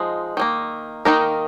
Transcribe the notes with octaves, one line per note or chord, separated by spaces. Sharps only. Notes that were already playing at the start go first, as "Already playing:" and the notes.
Already playing: F3 G#3 D#4
D#3 G3 A#3
D#3 A#3 D#4 A#4